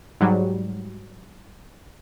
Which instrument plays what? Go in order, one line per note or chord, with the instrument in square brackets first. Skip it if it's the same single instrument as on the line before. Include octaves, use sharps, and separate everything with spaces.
[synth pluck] G#2 F#3 G3